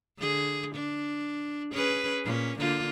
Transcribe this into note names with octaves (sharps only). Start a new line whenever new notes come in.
D3 G#4
D4
C#4 G#4 B4
A#2 C#4
D3 A#3 F4